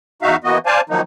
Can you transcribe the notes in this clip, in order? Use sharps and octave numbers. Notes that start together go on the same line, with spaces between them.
E2 D#4 F#4 E5 F5
E3 A#3 B3 F#4 D#5
C5 D5 F5 G#5 A5
D#3 F3 F#3 A#3 D#4